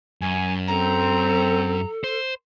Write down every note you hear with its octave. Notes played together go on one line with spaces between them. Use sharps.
F#2 G#5
C4 A4 A#5
C5